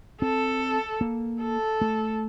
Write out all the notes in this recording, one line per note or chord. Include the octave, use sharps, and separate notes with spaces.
C4 A4
A#3
A4
A3